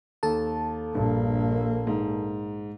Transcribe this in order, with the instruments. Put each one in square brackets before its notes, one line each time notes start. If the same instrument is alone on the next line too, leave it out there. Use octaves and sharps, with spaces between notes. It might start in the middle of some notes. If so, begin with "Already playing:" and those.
[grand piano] D#2 [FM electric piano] A4 A5
[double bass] A#1 A#3 [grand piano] G2
[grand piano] G#2